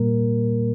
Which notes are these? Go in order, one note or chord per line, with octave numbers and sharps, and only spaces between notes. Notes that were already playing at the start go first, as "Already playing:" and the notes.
Already playing: A#2 G3 A#3 A#4